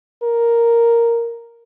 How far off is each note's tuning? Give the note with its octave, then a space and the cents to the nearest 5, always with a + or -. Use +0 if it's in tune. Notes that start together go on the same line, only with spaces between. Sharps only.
A#4 +0